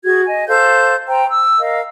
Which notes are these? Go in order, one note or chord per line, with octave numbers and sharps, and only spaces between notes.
F#4 G#4 G#6
D#5 G#5
A4 C5 F5 G6
C5 G5 A#5
E6
A#4 D#5 F5